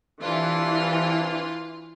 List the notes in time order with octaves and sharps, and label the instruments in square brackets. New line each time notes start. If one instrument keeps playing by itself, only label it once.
[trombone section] C2 C3 D4 [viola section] E3 [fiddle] F4 C6